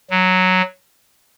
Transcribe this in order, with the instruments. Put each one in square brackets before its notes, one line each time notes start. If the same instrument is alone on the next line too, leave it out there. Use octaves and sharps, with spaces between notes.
[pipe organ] F#3